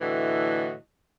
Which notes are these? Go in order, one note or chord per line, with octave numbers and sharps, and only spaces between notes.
A2 D3 E3 F#4 D#5